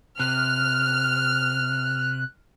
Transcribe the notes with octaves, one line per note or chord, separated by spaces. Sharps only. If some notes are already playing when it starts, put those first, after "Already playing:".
C3 F6 F#6